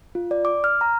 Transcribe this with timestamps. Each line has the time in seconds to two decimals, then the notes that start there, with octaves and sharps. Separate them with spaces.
0.15 F4
0.31 D5
0.45 D6
0.64 F6
0.81 A#5